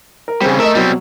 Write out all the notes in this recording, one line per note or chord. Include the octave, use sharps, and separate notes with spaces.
A#4
C#3 G3 C4 G#4
A3 A#4 D#5 E5
B2 F#3 G3 C4